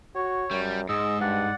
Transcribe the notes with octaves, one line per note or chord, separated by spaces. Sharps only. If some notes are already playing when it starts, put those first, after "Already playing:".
F#4 C#5
F#2 G3
G#2 G#3 D#5 E6
G2 D5 F#5